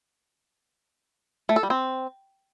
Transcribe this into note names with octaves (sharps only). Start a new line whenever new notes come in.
A3
A4
G3
C4